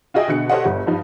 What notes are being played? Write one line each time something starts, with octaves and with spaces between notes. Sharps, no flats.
F4 F#4 G#4 D#5 E5 G5
B2 D3 F#6 C#7
G4 A4 C5 C#5 D#5 F#5
G1
G2 F3 D#4